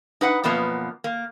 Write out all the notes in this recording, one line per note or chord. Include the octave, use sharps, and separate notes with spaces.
D#4 B4 F#5
F#2 B2 F3 A#3 B3
A#3